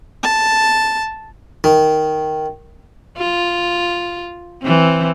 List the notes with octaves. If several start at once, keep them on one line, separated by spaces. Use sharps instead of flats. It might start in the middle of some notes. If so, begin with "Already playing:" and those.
A5
D#3
F4
E3 C4